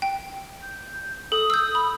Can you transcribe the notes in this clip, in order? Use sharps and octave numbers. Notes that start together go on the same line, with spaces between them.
G5
G6
A4 D#6
E6 G6
B5